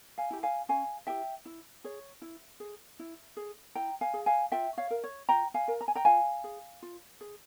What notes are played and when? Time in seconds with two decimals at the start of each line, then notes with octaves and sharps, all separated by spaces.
0.18 F5 G#5
0.31 E4 G4
0.43 F5 G#5
0.69 C#4 F5 G#5
1.07 E4 G4 E5 G5
1.45 E4
1.84 G#4 C#5
2.22 E4
2.60 G#4
2.99 E4
3.37 G#4
3.75 E4 G5 A#5
4.01 F5 G#5
4.14 G#4
4.26 F5 G#5
4.52 F4 E5 G5
4.77 C#5 F5
4.91 A#4
5.04 C#5
5.29 F4 G5 A#5
5.54 F5 G#5
5.68 A#4
5.81 A#5
5.88 G#5
5.95 G5 A#5
6.05 F4 F5 G#5
6.44 G#4
6.82 F4
7.21 G#4